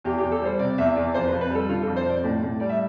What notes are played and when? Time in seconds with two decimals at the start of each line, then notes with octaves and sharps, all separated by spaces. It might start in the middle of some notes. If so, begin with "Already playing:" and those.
0.04 E2 G4
0.18 G4
0.23 E2
0.32 A4
0.42 G3 C5
0.59 C3 D5
0.78 E2 E5
0.96 E2 D5
1.14 F2 C5
1.27 F2 B4
1.41 B4
1.50 G3 A4
1.68 D3 F4
1.83 F2 A4
1.96 C5
2.05 F2 D5
2.24 A2
2.42 A2
2.60 G3 D5
2.69 E5